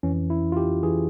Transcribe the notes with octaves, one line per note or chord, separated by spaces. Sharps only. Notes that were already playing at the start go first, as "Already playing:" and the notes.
F2 E3 C#4
E4
F4
G4
E3 G#4